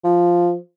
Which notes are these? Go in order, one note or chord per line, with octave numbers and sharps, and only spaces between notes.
F3